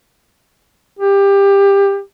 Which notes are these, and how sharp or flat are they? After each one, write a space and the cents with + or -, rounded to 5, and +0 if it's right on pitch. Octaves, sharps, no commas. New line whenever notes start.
G4 +20